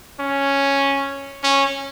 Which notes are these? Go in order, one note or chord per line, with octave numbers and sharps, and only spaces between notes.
C#4
C#4